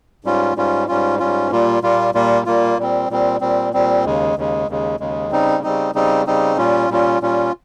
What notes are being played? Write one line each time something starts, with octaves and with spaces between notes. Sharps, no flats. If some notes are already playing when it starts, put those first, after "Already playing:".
G#2 G3 C#4 F4
G#2 G3 C#4 F4
G#2 G3 C#4 F4
G#2 G3 C#4 F4
A#2 G3 A#3 F4
A#2 G3 A#3 F4
A#2 G3 A#3 F4
A#2 G3 A#3 F4
A#2 G3 C4
A#2 G3 C4
A#2 G3 C4
A#2 G3 C4
D#2 C#3 G#3
D#2 C#3 G#3
D#2 C#3 G#3
D#2 C#3 G#3
C#3 G3 C4 D#4
C#3 G3 C4 D#4
C#3 G3 C4 D#4
C#3 G3 C4 D#4
A#2 G3 C#4 F4
A#2 G3 C#4 F4
A#2 G3 C#4 F4